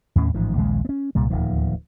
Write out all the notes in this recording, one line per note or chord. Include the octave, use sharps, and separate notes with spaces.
D#2 A2 C#4
A1 G#2 D#3 F3
A#1 D#2 C#3 G#3
B3 C#4
C2 A#2 G3
D1 D#2 D#3 F3